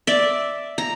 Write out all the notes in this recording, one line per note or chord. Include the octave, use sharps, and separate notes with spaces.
D5 E5
A#5